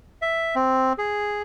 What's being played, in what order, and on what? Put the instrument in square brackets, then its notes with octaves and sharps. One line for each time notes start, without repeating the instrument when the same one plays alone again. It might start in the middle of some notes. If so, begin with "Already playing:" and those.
[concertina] E5
C4
G#4